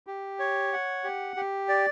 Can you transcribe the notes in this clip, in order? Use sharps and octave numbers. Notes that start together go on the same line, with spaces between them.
G4
C#5
F#5
G4
G4
D5